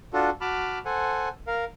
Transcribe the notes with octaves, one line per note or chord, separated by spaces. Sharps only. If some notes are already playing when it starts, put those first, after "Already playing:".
D4 F4 F#4 A4
F#4 A5 B5 D6 F6
A4 C5 F#5 G#5
A#4 F5